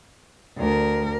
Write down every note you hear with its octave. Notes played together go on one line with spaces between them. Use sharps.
D2 A#4